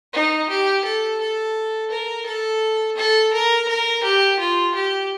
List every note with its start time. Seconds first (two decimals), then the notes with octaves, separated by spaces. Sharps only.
0.13 D#4
0.49 G4
0.84 A4
1.20 A4
1.91 A#4
2.26 A4
2.97 A4
3.33 A#4
3.68 A#4
4.03 G4
4.39 F4
4.74 G4